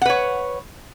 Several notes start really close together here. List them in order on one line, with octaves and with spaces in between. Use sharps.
F#5 B4 C#5